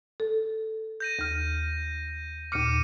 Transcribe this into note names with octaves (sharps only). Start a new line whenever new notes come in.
A4
G6 A#6 D#7
D#2 F6
D#2 A#2 D6 F6 C#7 D#7